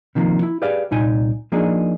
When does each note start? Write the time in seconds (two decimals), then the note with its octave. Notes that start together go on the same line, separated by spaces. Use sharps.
0.15 C3 D#3 F3 G3 A#3
0.42 E4
0.62 G4 G#4 B4 D5 F5
0.91 C2 A#2 D#4 G5 G#5
1.52 F3 A#3 D4 D#4 G#4